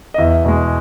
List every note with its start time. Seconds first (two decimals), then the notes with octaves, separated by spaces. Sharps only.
0.14 D#5
0.18 E2 E5
0.44 B2 G#3